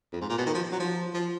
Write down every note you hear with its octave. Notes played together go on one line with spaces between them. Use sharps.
F2
G#2
A#2
B2
D#3
F3
F#3
F3
F3